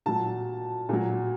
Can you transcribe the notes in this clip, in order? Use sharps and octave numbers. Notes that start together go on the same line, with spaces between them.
A#2 F#3 A5
A#2 F#3